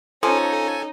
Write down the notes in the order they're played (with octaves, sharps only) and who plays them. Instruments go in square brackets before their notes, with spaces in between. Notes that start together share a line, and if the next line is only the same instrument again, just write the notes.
[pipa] F3 [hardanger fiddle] C#4 [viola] D#4 [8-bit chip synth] A4 G#5